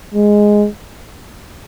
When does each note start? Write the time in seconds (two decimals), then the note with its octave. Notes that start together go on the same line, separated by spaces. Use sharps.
0.15 G#3